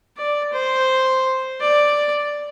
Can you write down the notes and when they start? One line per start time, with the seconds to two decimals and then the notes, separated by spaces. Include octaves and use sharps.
0.17 D5
0.53 C5
1.60 D5